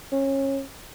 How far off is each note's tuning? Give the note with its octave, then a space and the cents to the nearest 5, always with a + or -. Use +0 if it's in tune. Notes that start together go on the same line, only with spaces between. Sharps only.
C#4 -25